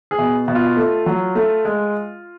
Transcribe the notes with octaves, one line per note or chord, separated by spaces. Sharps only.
G#4
B2
B2
F4
A3
F#3
A3
G#3